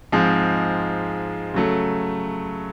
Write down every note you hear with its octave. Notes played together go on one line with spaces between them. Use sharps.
G#2 F3 G#3 C4
C#3 F#3 A3